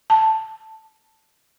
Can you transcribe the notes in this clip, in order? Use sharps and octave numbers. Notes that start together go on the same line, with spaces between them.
A5